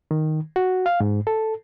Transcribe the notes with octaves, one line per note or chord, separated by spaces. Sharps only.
D#3
F#4
F5
G#2
A4